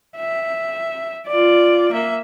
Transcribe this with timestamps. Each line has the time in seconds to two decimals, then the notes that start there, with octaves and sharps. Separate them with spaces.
0.17 E5
1.27 F4 D5
1.92 A#3 E5